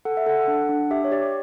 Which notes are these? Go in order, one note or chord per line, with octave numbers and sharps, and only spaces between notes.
A4 F#5
E5
A4 F#5
D4
D4
G4 E5
C#5
G4 D5